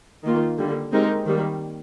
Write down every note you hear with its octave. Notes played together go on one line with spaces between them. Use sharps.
D#3 A#3 F4
D3 G3 A#3
G#3 C4 D#4 G4 A#4
D#3 G3 A#3